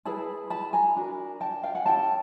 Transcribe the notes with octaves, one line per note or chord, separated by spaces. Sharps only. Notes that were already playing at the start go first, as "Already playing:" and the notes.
E4 G#4 B4 A5 B5
A5 B5
G#5 A#5
D4 F#4 A#4
G5 A5
F5 G5
F#5 G#5
C#4 E4 G4 G5 A5